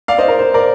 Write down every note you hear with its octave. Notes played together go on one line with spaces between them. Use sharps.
D5 F5
C5 D#5
A#4
C5
A#4 D5